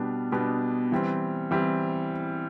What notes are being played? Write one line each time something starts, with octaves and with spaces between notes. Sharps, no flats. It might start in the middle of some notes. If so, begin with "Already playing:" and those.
Already playing: B2 G3 B3 D4
B2 G3 B3 D4
E3 G3 C4
E3 G3 C4